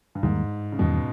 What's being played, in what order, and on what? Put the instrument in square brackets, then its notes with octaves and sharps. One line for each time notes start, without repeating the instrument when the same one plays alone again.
[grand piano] G2
[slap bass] E2 D#3 G3 A#3 [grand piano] G#2
[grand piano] C#3
[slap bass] E2 D#3 G3 A#3 [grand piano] B2